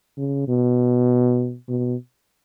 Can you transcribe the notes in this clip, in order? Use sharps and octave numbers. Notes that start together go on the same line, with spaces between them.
C#3
B2
B2